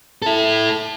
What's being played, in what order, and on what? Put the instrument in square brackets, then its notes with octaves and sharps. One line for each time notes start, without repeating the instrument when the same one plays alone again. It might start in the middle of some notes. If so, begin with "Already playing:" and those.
[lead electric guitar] E4 A4